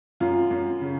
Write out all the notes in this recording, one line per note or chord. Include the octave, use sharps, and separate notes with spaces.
F#2 F4
F#2
C#3